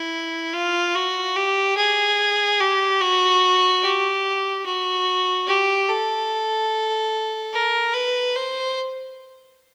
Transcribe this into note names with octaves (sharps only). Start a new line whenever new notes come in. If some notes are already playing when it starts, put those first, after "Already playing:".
Already playing: E4
F4
F#4
G4
G#4
G4
F#4
G4
F#4
G4
A4
A#4
B4
C5